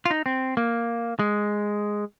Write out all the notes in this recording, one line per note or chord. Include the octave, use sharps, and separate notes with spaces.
F4
D#4
C4
A#3
G#3